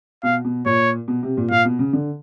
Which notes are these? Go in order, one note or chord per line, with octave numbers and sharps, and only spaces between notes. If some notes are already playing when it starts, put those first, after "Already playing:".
B2 F5
B2
A#2 C#5
B2
C3
A#2
A#2 F5
B2
C#3
D3